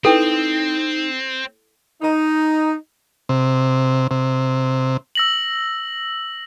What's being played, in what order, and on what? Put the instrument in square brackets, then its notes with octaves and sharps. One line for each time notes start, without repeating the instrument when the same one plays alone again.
[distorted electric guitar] C4 [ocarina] D#4 [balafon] E4 B4 G5 [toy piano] A4
[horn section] D#4
[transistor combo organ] C3
C3
[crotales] E6 A#6 F#7